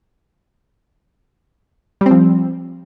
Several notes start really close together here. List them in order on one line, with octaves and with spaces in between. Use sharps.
G3 C4 F3